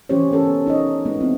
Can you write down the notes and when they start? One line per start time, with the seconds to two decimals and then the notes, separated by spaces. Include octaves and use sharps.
0.09 E3 A3 C#4 G4 C5 C#5
0.31 B3 C#4 A4 A#4
0.66 D#4 C#5 D#5
1.05 G#3 B3 D#4
1.20 B3 C4 E4